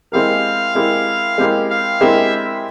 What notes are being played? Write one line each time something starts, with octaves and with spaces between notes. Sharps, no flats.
G#3 C4 E4 G4 A#4 F5
G#3 C4 E4 G4 A#4
G#3 C4 E4 G4 A#4
F5
G#3 C4 E4 G4 A#4 E5